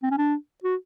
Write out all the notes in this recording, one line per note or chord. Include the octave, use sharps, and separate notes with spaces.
C4
C#4
D4
F#4